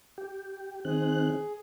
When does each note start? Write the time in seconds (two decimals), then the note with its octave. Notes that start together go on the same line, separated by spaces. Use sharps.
0.18 G4
0.85 D#3 C4 G#4 F#6